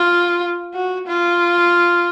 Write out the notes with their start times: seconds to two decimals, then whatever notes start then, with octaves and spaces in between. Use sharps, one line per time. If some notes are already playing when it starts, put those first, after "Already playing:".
Already playing: F4
0.74 F#4
1.07 F4